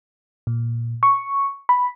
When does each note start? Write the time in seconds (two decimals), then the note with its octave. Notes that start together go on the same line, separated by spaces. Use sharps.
0.47 A#2
1.03 C#6
1.69 B5